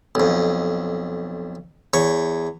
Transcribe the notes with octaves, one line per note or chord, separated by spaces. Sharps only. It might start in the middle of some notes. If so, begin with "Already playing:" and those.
B1 F2
E2 C#5